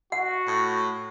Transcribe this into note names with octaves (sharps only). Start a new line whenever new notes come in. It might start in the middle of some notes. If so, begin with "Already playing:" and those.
F#4 F#5
A2